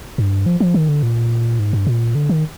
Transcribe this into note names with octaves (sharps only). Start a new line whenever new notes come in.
G2
F3
F3
D#3
D3
A#2
G#2
G2
A#2
D3
D#3